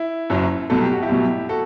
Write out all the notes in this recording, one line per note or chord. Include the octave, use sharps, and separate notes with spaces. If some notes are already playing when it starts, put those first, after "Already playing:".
Already playing: E4
F#1 F#2 F#3
C2 B2 F#3 A4
G4
F#4
E4 G4
C2 B2 F#3
F#4 A4